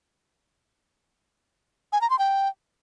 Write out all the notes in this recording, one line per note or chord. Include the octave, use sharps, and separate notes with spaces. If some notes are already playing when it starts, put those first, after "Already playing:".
G#5
A#5
C6
G5